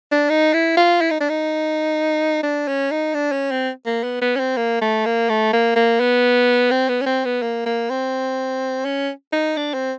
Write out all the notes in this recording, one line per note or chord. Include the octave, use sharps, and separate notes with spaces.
D4
D#4
E4
F4
E4
D#4
D4
D#4
D4
C#4
D#4
D4
C#4
C4
A#3
B3
B3
C#4
C4
A#3
A3
A#3
A3
A#3
A#3
B3
C4
B3
C#4
C4
B3
A#3
A#3
C4
C#4
D#4
D4
C4